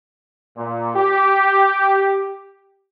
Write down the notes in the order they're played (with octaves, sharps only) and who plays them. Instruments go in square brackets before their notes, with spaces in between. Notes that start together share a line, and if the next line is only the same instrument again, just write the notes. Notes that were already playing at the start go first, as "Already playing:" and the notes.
[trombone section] A#2
G4